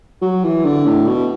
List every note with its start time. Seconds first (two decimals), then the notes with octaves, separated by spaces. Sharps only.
0.22 F#3
0.43 E3
0.65 D3
0.86 A2
1.07 B2